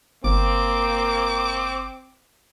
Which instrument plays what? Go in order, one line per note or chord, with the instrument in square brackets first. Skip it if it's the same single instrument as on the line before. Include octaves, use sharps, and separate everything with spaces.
[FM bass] G1 [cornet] A#3 [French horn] C4 [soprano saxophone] D6